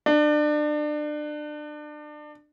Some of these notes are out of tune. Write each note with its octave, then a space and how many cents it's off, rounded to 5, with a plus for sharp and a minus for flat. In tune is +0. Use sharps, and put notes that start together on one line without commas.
D4 +30